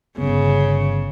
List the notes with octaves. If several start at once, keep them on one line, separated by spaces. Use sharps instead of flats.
G1 C#3 B3